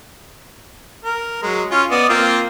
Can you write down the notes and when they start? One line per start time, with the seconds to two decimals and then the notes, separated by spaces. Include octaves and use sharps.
1.05 A#4
1.43 F#3 G#3
1.71 C#4 F4
1.91 B3 D5 D#5
2.09 A#3 C4 F4